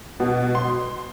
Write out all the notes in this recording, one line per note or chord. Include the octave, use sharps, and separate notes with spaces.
B2
C6